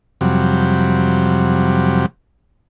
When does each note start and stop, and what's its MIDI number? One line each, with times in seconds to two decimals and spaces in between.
0.21 2.06 41
0.21 2.06 48
0.21 2.06 54
0.21 2.06 55